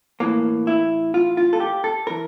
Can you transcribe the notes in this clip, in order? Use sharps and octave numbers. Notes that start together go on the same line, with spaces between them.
A2 E3 A#3
E4
F4
F4
A4
G4
A4
E3 A#4